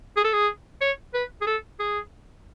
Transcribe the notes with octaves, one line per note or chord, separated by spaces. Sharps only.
G#4
A4
G#4
C#5
B4
G#4
A4
G#4